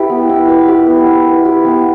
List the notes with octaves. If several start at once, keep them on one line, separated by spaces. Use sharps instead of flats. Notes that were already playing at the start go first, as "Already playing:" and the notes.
Already playing: E4 G4 B4
B3
E4
B4
G4
B3
E4
B4
G4
B3